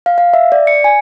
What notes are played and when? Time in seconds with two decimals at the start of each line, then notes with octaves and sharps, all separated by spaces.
0.06 F5
0.18 F5
0.33 E5
0.52 D5
0.67 C#7
0.84 G#5